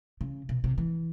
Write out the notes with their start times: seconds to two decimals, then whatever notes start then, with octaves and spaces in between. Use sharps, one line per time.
0.21 C#3
0.49 B2
0.64 C3
0.78 E3